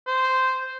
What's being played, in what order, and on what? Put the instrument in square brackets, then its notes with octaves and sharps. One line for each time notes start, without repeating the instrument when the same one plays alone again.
[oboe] C5